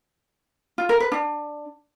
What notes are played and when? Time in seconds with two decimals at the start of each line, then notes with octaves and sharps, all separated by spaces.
0.78 F4
0.89 A#4
1.00 B4
1.12 D4